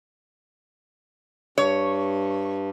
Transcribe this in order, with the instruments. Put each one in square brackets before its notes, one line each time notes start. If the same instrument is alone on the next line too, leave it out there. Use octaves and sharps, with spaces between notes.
[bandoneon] G2 [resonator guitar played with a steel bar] C#5